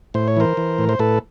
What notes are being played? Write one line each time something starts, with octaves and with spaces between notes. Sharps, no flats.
A2 C5
C#5
E3 A#4 C5
E3
A2
C5
A2 A4 B4